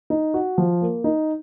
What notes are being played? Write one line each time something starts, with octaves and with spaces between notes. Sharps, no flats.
D#4
F#4
F3
A#3
D#4